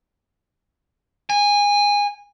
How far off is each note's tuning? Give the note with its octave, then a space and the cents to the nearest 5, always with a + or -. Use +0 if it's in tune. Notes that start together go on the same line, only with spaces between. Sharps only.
G#5 -20